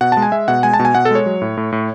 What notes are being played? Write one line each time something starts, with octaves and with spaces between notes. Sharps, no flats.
B2 F#5
G#3 A5
G#5
G#3 E5
B2 F#5
G#3 G#5
A5
B2
G#5
B2 F#5
A4
G#3 C#5
F#3
A2
A2
A2